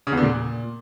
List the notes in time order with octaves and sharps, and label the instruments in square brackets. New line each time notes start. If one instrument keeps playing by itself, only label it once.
[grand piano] C#3
E2
D3
A#2